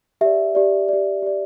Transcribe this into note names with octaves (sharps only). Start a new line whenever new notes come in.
G4 D5 E5
G4 D5
G4 D5
G4 D5